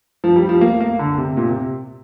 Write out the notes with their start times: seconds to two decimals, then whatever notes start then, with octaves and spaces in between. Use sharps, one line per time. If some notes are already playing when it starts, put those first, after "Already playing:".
0.24 F3
0.36 G3
0.49 F3
0.61 A#3
0.80 A#3
0.99 D3
1.18 C3
1.37 A#2
1.49 C3